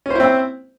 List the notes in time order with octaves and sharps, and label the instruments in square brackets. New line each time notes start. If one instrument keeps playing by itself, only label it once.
[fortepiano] C#4
C5
E4
C4